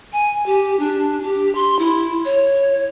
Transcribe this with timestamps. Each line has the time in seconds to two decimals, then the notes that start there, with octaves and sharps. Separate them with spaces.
0.13 G#5
0.46 G4
0.79 D4
1.23 G4
1.55 C6
1.79 E4
2.25 C#5